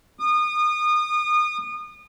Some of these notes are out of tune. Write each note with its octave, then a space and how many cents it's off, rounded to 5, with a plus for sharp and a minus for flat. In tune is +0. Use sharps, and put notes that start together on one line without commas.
D#6 -30